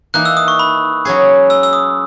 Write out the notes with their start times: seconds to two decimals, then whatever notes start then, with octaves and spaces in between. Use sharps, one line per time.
0.14 E3 A#3 D#4 F#6
0.25 E6
0.37 D#6
0.48 C#6
0.59 B5
1.05 F#3 C#4 G#4
1.50 E6
1.63 E6
1.73 D#6